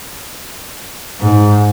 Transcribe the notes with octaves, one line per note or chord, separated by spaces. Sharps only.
G#2